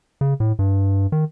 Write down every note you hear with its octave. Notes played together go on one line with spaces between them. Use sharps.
C#3
A2
G2
D#3